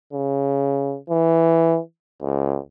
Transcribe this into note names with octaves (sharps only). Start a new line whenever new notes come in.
C#3
E3
C#2